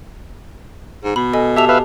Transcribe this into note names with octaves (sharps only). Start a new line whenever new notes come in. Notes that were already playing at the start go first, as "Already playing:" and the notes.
G#2
B2 B5
A4 D#5 G#5
G4 E5 A5 F7
B4 E5 F5